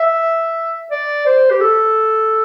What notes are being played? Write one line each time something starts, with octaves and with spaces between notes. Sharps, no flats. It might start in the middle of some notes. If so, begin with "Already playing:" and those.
Already playing: E5
D5
C5
G4
A4